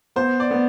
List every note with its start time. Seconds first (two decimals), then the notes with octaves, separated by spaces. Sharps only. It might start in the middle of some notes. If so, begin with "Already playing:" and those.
0.16 B3 C5
0.40 D5
0.51 B3